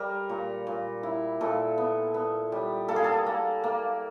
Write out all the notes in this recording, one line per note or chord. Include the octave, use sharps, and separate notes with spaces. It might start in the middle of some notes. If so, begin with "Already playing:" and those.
Already playing: G3 A#4
A#2
A#2
E4
A#2 A4
B3
B3
G3
A#3 A4
G#4
A4
A#3
A#3